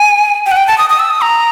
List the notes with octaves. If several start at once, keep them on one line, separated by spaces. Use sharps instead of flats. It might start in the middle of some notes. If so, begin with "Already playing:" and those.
Already playing: G#5
G5
F#5
G5
A5
D#6
D#6
E6
D#6
A#5